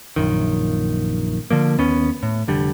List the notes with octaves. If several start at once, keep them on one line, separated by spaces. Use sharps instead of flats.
A#1 F#2 D#3
D3 F3 A#3
D#2 B3 C#4
A2
F1 D3 G3